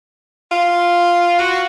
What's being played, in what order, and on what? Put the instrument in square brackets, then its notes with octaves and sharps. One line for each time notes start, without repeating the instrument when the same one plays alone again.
[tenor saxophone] F4
F#4